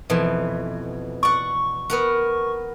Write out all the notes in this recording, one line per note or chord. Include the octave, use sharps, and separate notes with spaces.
F2 B2 E3
D5 F#5 C#6
B3 A#4 F#5